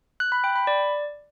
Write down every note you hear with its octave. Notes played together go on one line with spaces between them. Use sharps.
F#6
B5
G5
B5
D5